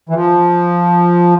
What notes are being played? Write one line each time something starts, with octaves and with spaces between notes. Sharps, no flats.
E3
F3